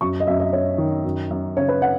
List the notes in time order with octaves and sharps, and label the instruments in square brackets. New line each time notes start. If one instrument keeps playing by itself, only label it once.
[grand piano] F#2 [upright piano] C#6
[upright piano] D#5
[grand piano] F#2 [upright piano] E5
[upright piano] D#5
[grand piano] F#2 [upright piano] C#5
[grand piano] D#3
F#2
F#2
[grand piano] C#3 [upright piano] C#5
[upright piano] B4
F#5